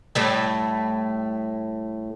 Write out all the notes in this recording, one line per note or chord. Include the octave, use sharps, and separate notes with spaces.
A2 G3 A3